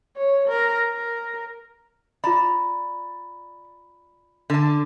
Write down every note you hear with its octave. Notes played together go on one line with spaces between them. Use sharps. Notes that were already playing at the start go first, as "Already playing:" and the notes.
C#5
A#4
A#4
F4 D5 A#5 B5
D3 A5